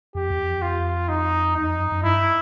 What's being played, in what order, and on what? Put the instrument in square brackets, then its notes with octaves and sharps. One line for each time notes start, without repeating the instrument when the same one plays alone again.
[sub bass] F2 [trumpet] G4
[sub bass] E2
F2
[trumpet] F4
D#4
[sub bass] E2 [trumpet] D#4
[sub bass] F2
F#2
F#2
[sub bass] G2 [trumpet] E4